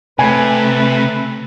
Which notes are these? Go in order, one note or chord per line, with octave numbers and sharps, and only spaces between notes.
C3 A3 B4 G#5